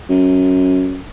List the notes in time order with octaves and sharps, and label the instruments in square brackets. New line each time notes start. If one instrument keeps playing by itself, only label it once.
[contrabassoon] F#2